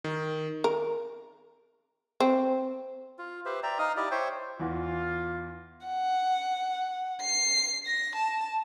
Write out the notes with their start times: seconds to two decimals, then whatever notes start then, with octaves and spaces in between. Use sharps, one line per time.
0.04 D#3
0.64 A#4
2.20 C4
3.18 F4
3.45 G4 B4 C5 E5
3.63 D5 E5 G5 A#5
3.79 D#4 D#5 F5 D#6
3.97 E4 G4 D5 D#5
4.11 C5 C#5 E5 G5
4.59 E2 E3 F4
5.86 F#5
7.22 C7
7.86 A#6
8.15 A5